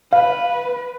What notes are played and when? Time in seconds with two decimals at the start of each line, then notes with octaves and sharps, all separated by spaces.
0.13 B4 F5